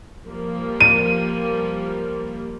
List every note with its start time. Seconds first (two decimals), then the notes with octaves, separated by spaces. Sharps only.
0.24 F3 G3 A#3
0.80 D#7